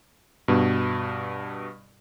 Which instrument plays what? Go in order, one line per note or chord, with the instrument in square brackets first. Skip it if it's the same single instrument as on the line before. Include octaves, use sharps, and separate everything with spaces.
[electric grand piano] G2 B2